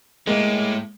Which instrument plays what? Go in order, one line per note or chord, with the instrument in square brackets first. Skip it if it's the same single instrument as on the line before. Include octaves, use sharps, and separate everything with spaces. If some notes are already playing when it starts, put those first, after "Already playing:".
[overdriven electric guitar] A2 [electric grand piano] G#3 A#3